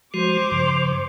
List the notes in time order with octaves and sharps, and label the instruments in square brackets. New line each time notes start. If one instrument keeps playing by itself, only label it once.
[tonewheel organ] F3 G#3 F#4 [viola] C5 D6
[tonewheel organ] G2 C#3 F3